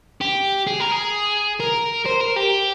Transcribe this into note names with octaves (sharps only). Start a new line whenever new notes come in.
G4
G#4
A#4
G#4
A#4
C5
A#4
G4